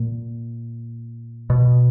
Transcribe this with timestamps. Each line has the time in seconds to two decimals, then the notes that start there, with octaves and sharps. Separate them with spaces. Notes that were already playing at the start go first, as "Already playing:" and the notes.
Already playing: A#2
1.50 B2